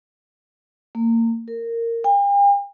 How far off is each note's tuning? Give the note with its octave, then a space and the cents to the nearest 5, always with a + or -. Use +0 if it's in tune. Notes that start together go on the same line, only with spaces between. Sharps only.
A#3 -30
A#4 -15
G5 +45